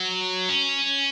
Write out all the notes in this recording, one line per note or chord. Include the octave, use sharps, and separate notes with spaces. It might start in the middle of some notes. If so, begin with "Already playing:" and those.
Already playing: F#3
C#4